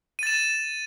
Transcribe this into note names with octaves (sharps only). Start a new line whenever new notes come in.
A6 D#7 E7